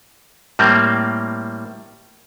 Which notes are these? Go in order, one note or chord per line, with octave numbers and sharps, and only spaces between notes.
A2 G3 A#3 C4